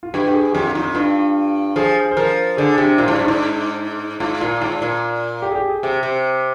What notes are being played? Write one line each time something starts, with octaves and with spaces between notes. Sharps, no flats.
F4
G2 G4
G4
G#4
F2 G4
F4
F2 D#4
G2 F4
F3 G#4
C5
F3 A#4
D3 G#4
C3 G4
A#2 F4
G#2 D4
G2
G#2 D#4
G#2 F4
A#2 F4
G#2 F4
A#2
G4
G#4
G4
G#4
C3 G4
C3